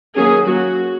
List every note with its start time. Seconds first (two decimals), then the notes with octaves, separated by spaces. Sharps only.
0.16 D#3 F#3 A#3 C#4 G#4
0.47 F#3 A#3 C#4 F#4